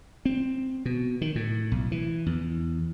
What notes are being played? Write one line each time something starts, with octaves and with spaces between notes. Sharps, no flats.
C4
B2
D#3
A2
B1
E3
E2